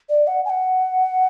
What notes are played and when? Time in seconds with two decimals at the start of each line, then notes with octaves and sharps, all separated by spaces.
0.09 D5
0.27 F#5
0.45 G#5
0.50 F#5